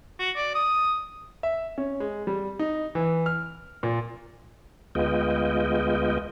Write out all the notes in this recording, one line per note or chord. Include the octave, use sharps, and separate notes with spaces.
F#4
D5
D#6
E5
C#4
G#3
G3
D#4
E3
F6
A#2
D2 G#3 B3 F4 D#5 G5